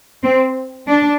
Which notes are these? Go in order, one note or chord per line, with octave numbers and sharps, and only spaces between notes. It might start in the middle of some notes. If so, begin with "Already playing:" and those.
C4
D4